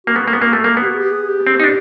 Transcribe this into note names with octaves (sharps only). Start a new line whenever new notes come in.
A#3 F#4
B3
A#3
B3
A#3
A3
A#3
B3
G4
F#4
G#4
G4
G#4
G4
C4
D#4
D4